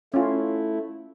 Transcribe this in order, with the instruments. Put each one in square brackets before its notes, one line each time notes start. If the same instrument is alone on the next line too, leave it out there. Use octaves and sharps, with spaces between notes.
[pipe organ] A3 E4 [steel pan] C#4 F4